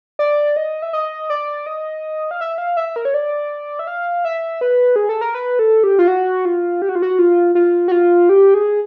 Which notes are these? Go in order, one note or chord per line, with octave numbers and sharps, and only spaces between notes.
D5
D#5
E5
D#5
D5
D#5
F5
E5
F5
E5
A#4
C#5
D5
E5
F5
E5
B4
G#4
A4
A#4
B4
A4
G4
F4
F#4
F4
G4
F#4
F4
F#4
F4
F4
F#4
F4
G4
G#4